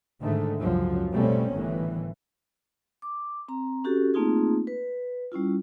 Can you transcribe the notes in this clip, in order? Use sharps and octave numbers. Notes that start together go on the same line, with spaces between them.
G#2 D3 D#3 A3
C#2 F#2 F3 F#3
B2 G3 A3 C4 C#4
G1 A2 D#3 E3
D6
C4 A#5
C#4 F#4 G4 A4
A3 A#3 C4 D#4 F4 G#4
B4
G3 C#4 E4 F4